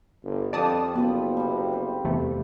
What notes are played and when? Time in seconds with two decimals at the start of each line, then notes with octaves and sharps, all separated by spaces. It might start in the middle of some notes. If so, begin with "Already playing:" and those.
0.23 G1
0.53 F2 G4 D5 A5 D#6
0.95 F#1 F3 B3 A4 B5
1.37 C3 G3
1.73 C5
2.04 E2 C3 A3